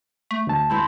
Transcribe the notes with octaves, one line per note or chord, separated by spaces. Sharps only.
A3
D2 A5
C4 E4 C5